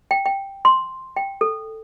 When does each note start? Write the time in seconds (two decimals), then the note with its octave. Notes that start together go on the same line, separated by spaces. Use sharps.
0.11 G5
0.26 G5
0.65 C6
1.16 G5
1.41 A4